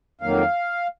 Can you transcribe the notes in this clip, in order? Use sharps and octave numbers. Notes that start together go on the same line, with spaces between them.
F2 D#3 F#3 A#3 F5